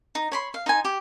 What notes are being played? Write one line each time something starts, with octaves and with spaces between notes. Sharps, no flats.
D#4
C#5 B5 C6
F5
D#4 C5 G#5
G4